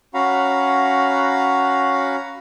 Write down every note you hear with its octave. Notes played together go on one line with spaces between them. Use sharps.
C#4 F#4 F5 F#5 A#5 B5